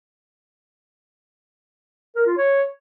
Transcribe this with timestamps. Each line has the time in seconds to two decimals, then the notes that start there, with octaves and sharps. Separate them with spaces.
2.15 A#4
2.26 F4
2.37 C#5